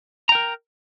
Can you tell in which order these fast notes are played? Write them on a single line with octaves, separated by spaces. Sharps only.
A#5 G5 A#4